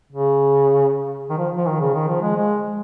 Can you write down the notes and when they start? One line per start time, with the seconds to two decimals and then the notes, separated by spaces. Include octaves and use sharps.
0.12 C#3
1.30 D#3
1.38 F3
1.57 F3
1.66 D#3
1.80 C#3
1.94 D#3
2.08 F3
2.22 G#3
2.36 G#3